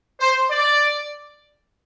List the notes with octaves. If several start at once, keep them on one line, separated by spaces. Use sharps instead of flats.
C5
D5